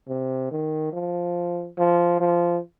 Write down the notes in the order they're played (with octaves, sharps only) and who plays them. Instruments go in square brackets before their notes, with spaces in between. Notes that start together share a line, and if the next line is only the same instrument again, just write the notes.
[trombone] C3
D#3
F3
F3
F3